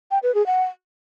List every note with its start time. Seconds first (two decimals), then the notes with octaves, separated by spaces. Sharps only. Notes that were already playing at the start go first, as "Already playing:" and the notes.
0.11 G5
0.23 B4
0.35 G#4
0.46 F#5